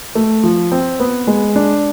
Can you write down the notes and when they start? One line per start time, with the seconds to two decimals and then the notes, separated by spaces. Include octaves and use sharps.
0.15 A3
0.43 F3
0.72 C4
1.00 B3
1.27 G#3
1.55 D4